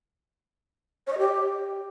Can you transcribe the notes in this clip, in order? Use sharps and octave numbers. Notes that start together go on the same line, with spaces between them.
C#5
D#5
G4